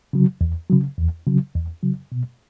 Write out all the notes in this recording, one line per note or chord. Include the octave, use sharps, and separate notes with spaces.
C#3 F#3
E2
C#3 F#3
E2
C#3 F#3
E2
C#3 F#3
B2